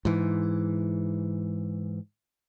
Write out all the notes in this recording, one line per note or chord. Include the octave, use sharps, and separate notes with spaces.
G#2 E3